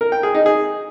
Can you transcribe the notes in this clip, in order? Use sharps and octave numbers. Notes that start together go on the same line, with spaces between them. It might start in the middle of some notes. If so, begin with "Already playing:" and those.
A#4
G5
G#4
D#4
G#4